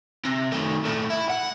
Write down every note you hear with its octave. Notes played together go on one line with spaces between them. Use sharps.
C3
D#3 A3
A#2 A3
E4
F#5